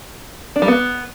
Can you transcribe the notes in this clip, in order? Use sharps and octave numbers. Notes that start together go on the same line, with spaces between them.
D4
G3
B3